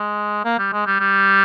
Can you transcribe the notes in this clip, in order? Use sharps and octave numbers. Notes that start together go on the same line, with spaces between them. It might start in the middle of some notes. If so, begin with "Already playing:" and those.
Already playing: G#3
A#3
G3
G#3
G3
G3